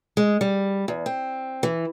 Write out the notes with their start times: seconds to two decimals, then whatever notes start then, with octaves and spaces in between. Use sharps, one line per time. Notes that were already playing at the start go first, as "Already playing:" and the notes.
0.17 G#3
0.41 G3
0.88 E2
1.06 C4
1.63 E3